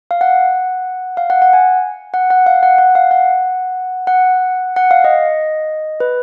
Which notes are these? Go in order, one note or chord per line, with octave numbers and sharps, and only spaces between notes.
F5
F#5
F5
F#5
F#5
G#5
F#5
F#5
F5
F#5
F#5
F5
F#5
F#5
F#5
F5
D#5
B4